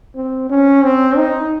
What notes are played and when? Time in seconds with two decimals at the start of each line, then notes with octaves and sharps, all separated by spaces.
0.15 C4
0.50 C#4
0.83 C4
1.17 D#4